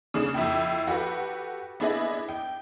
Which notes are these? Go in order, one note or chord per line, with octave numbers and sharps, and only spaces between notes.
C#3 D4 G#4 D#6 E7
F2 E4 G5
F#4 G4 A4 B4
B3 D4 E4 G#4 D5 D#5
G5